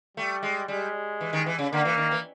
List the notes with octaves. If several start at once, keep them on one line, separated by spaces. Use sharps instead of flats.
G3 A3
G#3
G3 G#3
E3
D#3
E3
C#3
D3 A#3
E3
D#3
E3